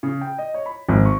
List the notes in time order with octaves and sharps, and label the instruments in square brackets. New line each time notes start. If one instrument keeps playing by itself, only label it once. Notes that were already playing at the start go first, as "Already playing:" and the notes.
[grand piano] C#3
G5
D#5
C#5
B5
G#1
C#6